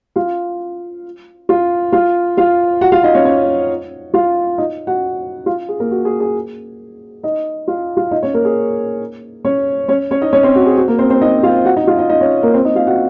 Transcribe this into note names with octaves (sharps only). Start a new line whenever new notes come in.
F4 F5
F4 F5
F4 F5
F4 F5
F#4 F#5
F4 F5
D#4 D#5
C#4 C#5
C#4 C#5
F4 F5
D#4 D#5
F#4 F#5
F4 F5
G#4
A#3 A#4
F#4
G#4
G#4
D#4 D#5
F4 F5
F4 F5
D#4 D#5
C#4 C#5
A#3 A#4
G#4
C#4 C#5
C#4 C#5
C#4 C#5
D#4 D#5
C#4 C#5
C4 C5
F#4
G#4
F#4
A#3 A#4
C4 C5
C4 C5
D#4 D#5
F4 F5
F#4 F#5
D#4 D#5
F4 F5
D#4 D#5
D#4 D#5
C#4 C#5
A#3 A#4
C4 C5
D#4 D#5
F4 F5
F#4 F#5